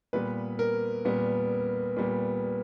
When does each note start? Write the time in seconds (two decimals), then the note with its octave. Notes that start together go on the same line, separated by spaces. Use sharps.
0.13 A#2 G3 B3 B4
0.59 A#4
1.05 A#2 G3 B3
1.97 A#2 G3 B3